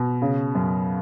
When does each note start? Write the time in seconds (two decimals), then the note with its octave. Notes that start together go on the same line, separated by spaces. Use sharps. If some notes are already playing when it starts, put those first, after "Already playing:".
Already playing: B2
0.22 C#3
0.55 F#2